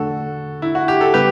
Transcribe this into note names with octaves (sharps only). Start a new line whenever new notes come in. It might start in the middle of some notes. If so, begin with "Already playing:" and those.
Already playing: E2 D3 A3 D4 F#4 A4
E4
F#4
G4
A4
C#3 G3 B3 G4 B4